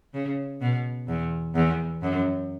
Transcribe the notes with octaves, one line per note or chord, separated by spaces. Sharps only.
C#3
B2
E2
E2
F#2